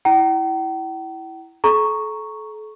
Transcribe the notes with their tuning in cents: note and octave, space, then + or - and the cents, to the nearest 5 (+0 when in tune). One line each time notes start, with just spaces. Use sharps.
E4 +0 G5 -45 A#5 +0
A4 -35 A#5 +0 C#6 +0